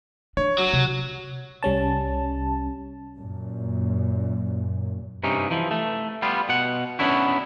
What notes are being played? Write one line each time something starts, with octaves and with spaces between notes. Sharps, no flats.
D4 C#5
F#3
C3
C2 G3 C#4 A5
F#2 A#2
G2 C3 C#4 D#4
E3 F3
A3
G3 B3 F4
B2 F#5
B3 C#4 D4 E4 F#4